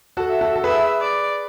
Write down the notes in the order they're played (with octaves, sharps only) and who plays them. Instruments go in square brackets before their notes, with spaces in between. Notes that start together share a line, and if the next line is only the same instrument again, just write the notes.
[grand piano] F#4 A4
[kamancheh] E5
[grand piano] F#4 A4
A4
[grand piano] G#4 B4 [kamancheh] E5
[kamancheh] D5